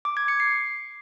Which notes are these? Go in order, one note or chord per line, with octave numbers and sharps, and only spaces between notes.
D6
G#6
C#7
C7